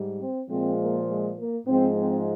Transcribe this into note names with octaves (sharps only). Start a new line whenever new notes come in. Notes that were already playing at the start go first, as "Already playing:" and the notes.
Already playing: G#2 G3
C4
A#2 F3 G#3 C4
A#3
G#3
A#3
G#2 F3 G#3 C4
C4